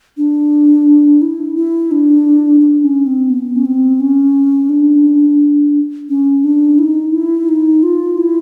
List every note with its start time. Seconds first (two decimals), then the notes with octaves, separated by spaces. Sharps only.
0.17 D4
1.22 E4
1.56 E4
1.91 D4
2.61 D4
2.84 C#4
3.07 C4
3.30 B3
3.56 C#4
3.65 C4
4.00 C#4
4.69 D4
6.09 C#4
6.44 D4
6.79 E4
6.84 D#4
7.13 E4
7.49 D#4
7.83 F4
8.18 E4